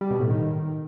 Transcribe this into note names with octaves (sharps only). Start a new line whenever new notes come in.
G3
B2
A2
D#3